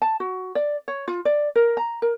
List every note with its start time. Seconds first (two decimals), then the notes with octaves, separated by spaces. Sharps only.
0.02 A5
0.20 F#4
0.55 D5
0.88 C#5
1.08 F4
1.25 D5
1.55 A#4
1.77 A#5
2.02 A#4